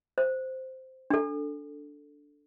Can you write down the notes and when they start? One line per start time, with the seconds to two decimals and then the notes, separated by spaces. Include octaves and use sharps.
0.18 C5
1.10 D4 A4